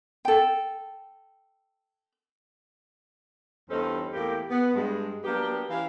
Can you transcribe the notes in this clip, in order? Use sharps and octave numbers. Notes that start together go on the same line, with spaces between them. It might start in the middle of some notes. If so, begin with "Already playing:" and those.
A4 G5
E2 G2 C#4 D#4 A4 C5
E2 A2 A#3 G4
B3
G2 G#3
F#3 A#3 B3 D4 G4
E3 C#4 G4 F5